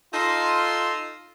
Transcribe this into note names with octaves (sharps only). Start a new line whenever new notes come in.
D#4 F4 A4 C6